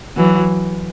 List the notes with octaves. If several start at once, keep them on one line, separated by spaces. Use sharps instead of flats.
E3 F#3